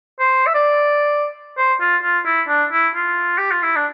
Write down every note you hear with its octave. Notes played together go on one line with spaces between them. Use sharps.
C5
E5
D5
C5
F4
F4
E4
D4
E4
F4
G4
F4
E4
D4